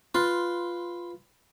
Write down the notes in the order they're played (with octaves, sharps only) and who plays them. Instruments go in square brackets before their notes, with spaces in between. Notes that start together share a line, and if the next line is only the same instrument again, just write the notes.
[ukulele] F4 [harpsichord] B4 C6